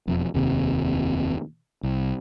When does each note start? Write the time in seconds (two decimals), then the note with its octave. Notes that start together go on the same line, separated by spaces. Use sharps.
0.07 E1 F2
0.34 F1 D#2 C3
1.83 C2